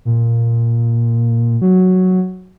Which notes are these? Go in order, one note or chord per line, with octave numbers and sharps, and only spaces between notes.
A#2
F#3